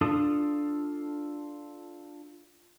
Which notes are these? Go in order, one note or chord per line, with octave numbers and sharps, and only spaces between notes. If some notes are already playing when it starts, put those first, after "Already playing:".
D4 F4 A4 D#6